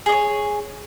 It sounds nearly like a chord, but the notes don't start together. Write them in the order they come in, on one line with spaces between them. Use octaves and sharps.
G#4 D#5 C#5